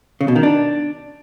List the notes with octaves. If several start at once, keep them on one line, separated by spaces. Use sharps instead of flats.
C#3
B2
D#3
D4